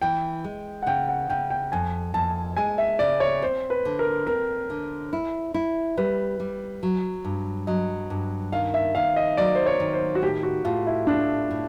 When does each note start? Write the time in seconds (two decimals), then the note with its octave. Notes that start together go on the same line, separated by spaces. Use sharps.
0.02 E3 G5
0.44 G#3
0.83 F#5
0.87 C#3 G5
1.09 F#5
1.30 C#3 G5
1.50 G5
1.72 F2 G#5
2.14 F2 A5
2.57 G#3 G#5
2.78 E5
2.99 C#3 D5
3.20 C#5
3.42 C4 C5
3.70 B4
3.85 D3
3.99 A#4
4.27 C4 A#4
4.70 D3
5.13 E4
5.54 E4
5.97 G3 B4
6.40 G3
6.83 F#3
7.25 G2
7.67 F#3 D#5
8.10 G2
8.52 D#3 F5
8.74 E5
8.95 D#3 F5
9.16 D#5
9.37 F#3 D5
9.55 C5
9.66 C#5
9.80 D#3
9.94 C5
10.15 F#4
10.22 A2 G4
10.43 F#4
10.64 A2 F4
10.87 E4
11.07 A2 D4
11.51 A2